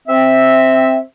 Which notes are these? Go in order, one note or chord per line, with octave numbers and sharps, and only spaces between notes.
C4 E5